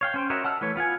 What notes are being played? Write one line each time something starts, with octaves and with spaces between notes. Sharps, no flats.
C#5 F5 G5
C#4 C5 G5
F#4 A#4 C#5 D#5 E5
F#5 A5 E6 F6
E3 A3 B4 C#5
B3 F4 F#5 G#5